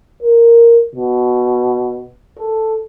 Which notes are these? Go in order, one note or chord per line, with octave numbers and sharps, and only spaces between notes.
A#4
B2
A4